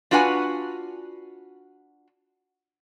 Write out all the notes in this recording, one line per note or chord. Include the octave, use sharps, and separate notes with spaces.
D4 F4 F#4 B4 F#5 G#5